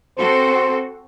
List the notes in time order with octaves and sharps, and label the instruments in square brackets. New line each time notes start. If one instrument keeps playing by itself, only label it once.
[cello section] C4 F#4 A4 [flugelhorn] C5